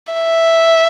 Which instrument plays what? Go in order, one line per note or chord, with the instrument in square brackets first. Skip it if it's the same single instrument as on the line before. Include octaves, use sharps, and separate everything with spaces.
[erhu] E5